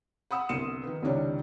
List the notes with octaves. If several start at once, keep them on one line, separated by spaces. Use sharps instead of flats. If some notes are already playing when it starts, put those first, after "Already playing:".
F#5 B5 D#6 E6
G1 C2 C6 C#7 D#7 E7
D#3 B4
C#2 C3 D#3 C#4 D4 E4